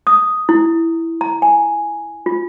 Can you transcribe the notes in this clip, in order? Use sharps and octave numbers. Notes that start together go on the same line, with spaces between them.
D#6
E4
A#5
G#5
F4